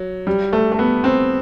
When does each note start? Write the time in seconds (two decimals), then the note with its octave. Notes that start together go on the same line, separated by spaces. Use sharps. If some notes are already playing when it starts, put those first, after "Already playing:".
Already playing: F#3
0.27 G3
0.53 A3
0.72 A3
0.79 B3
1.04 C4